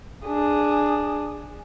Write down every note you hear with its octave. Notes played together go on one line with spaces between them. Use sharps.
D4 G#4